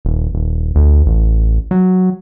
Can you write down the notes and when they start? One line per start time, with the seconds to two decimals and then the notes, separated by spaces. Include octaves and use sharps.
0.05 D#1
0.34 D#1
0.75 D2
1.06 A1
1.71 F#3